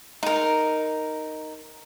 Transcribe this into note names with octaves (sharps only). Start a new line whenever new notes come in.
D#4 A#4